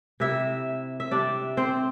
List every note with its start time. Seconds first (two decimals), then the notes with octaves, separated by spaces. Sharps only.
0.20 C3 G3 E4 E5
1.00 E5
1.11 C3 G3 D4 D5
1.57 C4 C5